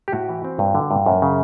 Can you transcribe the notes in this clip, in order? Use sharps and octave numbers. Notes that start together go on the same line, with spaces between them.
G4
A2 F#4
E3
C4
G2
D3
G2
F#2
C#3